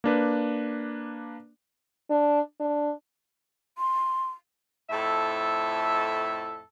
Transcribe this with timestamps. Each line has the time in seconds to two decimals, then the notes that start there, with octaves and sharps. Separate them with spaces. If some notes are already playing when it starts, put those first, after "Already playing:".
0.04 A#3 D4 B4
2.10 D4
2.60 D4
3.77 C6
4.90 F2 A2 A4 E5